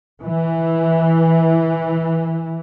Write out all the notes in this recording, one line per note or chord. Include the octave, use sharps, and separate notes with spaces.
E3